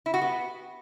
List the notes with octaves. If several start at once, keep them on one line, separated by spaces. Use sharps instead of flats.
E4
F#4
B3